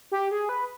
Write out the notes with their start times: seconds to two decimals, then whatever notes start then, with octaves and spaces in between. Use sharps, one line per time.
0.11 G4
0.31 G#4
0.49 B4